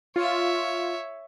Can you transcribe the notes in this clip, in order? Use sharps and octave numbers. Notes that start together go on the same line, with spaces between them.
F4 C#5 E5